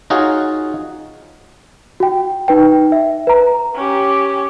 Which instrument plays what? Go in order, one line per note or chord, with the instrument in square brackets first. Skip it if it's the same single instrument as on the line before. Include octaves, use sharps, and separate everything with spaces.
[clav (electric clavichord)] D#4 F4 F#4 G#4 C#5
[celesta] F#4 G5
D#4 B4 G5
E5
B4 A#5
[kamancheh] C#4 G4